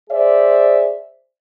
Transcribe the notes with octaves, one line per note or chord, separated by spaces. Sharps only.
G#4 C5 D5 E5